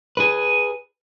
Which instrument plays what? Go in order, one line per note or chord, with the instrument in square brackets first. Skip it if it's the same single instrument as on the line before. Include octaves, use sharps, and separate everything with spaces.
[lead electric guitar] G#4 B4